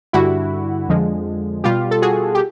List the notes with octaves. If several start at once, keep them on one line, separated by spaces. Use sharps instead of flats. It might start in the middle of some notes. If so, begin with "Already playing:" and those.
G2 D3 G3 E4 F#4
F2 D3 F3 G#3
B2 G3 F4 G4
A4
F#4 G#4
G4